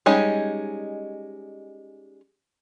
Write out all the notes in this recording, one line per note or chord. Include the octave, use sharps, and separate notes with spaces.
G3 G#3 C#4 D#4